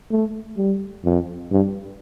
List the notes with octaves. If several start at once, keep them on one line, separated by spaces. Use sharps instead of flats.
A3
G3
F2
G2